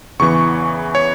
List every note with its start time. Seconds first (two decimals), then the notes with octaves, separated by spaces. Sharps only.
0.19 E2 C#3 E3 B3 C#6
0.95 C#5